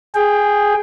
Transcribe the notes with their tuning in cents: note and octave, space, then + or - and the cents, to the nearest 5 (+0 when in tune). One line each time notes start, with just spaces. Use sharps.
G#4 +0 G5 +15